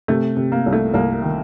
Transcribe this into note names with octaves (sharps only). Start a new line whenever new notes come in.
C3 A3
C3
A#3
C2
A3
C2 A#3
D#3